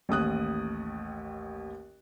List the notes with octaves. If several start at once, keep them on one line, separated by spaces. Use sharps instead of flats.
A1 D#2 D#6 F#6